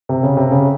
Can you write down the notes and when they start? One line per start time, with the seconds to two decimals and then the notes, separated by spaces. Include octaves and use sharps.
0.09 C3
0.23 C#3
0.37 C3
0.51 C#3